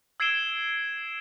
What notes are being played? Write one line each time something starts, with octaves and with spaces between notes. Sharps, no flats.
E6 G#6 C7 D7 E7 G7